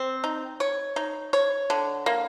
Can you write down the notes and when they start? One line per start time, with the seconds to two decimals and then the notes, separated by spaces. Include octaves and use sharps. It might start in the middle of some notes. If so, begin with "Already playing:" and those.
Already playing: C4
0.24 D#4
0.60 C#5
0.96 D#4
1.33 C#5
1.70 D3
2.06 A#3